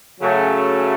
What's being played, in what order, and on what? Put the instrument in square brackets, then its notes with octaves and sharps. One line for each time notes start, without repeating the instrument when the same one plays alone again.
[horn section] C#3 F#3 A3